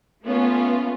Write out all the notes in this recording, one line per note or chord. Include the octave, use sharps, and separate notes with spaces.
A3 B3 C#4 F4